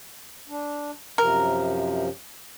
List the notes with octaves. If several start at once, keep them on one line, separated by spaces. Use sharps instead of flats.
D4
F#2 C3 F3 A#4